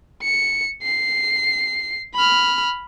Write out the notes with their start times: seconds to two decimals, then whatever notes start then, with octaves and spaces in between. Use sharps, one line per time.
0.23 C#7
0.83 C7
2.15 B5 F6